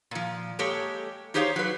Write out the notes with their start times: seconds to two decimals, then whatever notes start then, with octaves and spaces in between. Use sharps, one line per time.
0.11 A#2 F3
0.59 G#3 A#3 G4 A4 C#5
1.34 D#4 G4 G#4 C5 C#5 F5
1.56 F#3 B4